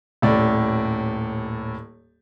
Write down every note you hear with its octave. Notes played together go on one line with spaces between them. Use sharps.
D#1 A2 D5